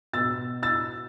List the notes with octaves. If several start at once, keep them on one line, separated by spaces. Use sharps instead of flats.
B2 B3 E6 A6
E6 A6